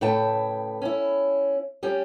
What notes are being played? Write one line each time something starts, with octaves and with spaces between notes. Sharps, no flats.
A2 C#3 B4 G5 A5
C#4 E4
G3 C#4 G4